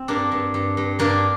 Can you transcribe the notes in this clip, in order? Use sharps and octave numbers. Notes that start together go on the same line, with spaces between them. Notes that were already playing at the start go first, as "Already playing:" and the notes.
Already playing: C4
G2 A#3 D4
G2
G2
G2
G2 A#3 D4